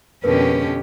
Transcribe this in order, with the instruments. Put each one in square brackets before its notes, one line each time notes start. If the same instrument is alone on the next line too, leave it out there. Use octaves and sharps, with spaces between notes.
[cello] F2 B2 [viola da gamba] D3 C#4 G4 [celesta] A#4 B4